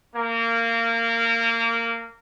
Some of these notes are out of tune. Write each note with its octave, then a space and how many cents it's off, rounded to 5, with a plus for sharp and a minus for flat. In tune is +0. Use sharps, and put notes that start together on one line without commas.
A#3 -20